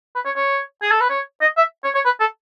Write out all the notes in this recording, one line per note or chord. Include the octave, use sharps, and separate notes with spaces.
B4
C#5
C#5
G#4
A4
B4
C#5
D#5
E5
C#5
C#5
B4
A4